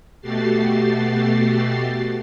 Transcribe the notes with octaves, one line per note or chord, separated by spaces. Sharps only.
B2 A3 F#4 G4 A6 C7